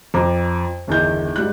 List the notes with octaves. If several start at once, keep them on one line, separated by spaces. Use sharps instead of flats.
F2 A#5 D6
G1 E2 D#3 G6
G#2 G3 F#6